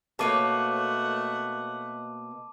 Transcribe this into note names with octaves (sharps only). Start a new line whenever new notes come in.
B2 A3 A#3 C#5 F#5 A5 D6 D#7